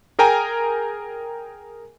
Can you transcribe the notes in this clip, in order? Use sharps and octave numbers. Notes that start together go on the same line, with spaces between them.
G#4 A#4 G5 G#5 A#5